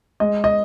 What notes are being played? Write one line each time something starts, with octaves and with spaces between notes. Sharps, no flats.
G#3 D#5
D#5